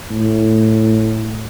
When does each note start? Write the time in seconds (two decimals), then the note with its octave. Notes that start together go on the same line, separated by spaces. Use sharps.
0.11 A2